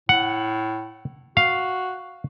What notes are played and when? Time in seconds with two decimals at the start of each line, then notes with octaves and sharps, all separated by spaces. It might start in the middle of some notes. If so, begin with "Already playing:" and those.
0.09 A2 F#5
1.37 F#4 F5